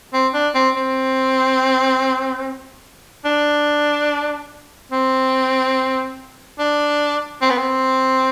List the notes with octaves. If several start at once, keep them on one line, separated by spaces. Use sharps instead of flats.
C4
D4
C4
C4
D4
C4
D4
C4
B3
C4